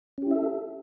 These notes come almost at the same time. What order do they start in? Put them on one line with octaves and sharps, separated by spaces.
C#4 G4 E4 E5 A4